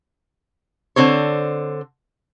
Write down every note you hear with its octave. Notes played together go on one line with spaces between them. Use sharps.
D3 C4 C5 C#5